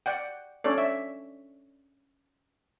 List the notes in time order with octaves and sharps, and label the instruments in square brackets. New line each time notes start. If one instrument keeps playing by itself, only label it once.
[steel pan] D5 F#5 G5
C#4 D4 A4 C#5 D5
E5